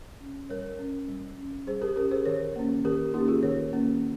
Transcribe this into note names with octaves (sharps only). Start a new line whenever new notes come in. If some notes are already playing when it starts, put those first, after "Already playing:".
C#4
G3 A#4 C#5
C#4
G3
C#4
G3 G#4 C5
G4 A#4
C#4 G4 A#4
G#4 C5
D#3 A#4 C#5
A#3 C#4
D#3 G4 A#4
A#3 C#4 D#4 G4
F4 G#4
D#3 A#4 C#5
A#3 C#4